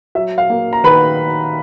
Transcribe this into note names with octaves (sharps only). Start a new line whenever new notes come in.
F#3 E5
F5
A#3
A#5
D#3 B4 B5